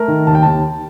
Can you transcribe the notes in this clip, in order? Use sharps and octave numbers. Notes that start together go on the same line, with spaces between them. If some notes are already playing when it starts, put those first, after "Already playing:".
Already playing: A3 A#4
D#3
D#2 A5
G5
D#2 A5